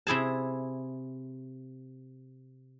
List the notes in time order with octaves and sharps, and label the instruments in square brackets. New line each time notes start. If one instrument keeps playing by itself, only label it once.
[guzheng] C3 E4 G#4 A5